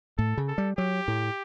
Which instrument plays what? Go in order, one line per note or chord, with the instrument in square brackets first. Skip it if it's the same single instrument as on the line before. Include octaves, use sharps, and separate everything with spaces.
[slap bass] A2 [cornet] A4
[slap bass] C#3
[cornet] A4
[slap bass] G3
[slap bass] F#3 [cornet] G4
[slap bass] A2